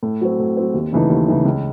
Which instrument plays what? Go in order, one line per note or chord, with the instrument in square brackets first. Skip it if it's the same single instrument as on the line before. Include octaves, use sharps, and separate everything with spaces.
[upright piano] A2
F#3 C4
A2
F#3 C4
D#2
C#3 E3 A3 D#4
D#2
C#3 E3 A3 D#4
C#2